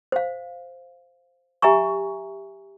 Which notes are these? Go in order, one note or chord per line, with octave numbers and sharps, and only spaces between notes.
C5 F5
G4 E5 G#5 A#5 C#6